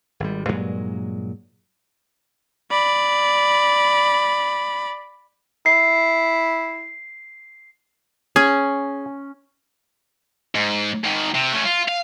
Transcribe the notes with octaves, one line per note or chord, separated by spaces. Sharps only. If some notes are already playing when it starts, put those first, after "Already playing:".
G#1 G3
G2 A#2 F#3 G#3
D5 B5
E4 C7
C#4 G#4
G#2
G#2 D#3
C3
A3 C#4
F4
F5